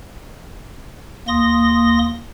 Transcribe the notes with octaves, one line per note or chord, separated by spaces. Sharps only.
D#2 A#3 C6 D#6 A#6